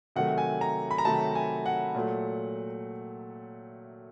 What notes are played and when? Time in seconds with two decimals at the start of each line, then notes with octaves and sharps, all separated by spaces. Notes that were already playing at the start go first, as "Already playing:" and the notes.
0.16 C3 D#3 F#3 A3 F#5
0.38 G#5
0.61 A#5
0.91 B5
0.98 A#5
1.05 C3 D#3 F#3 A3 A5
1.35 G#5
1.66 F#5
1.95 A#2 F#3 A3